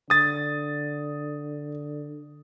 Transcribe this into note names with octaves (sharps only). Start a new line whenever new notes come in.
D3 D#6 A6